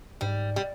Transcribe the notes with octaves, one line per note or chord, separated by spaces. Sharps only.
G#2 G3
G3